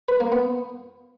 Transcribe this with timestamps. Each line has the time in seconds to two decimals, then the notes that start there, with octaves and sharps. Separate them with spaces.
0.08 B4
0.20 A#3
0.32 B3